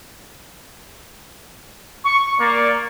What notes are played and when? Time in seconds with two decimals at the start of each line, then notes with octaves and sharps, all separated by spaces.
2.05 C#6
2.40 A#3 D5